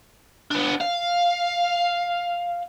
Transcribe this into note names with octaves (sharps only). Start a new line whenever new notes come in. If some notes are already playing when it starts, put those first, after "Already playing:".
B3 D4
F5